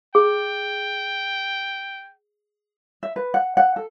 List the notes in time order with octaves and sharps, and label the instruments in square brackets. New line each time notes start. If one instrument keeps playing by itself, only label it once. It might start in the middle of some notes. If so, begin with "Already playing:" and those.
[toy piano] G#4 [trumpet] G5
[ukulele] E5
B4
F#5
F#5
A4